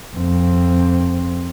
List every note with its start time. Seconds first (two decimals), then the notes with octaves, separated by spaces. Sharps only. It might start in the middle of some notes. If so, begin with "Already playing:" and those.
0.16 F2 C4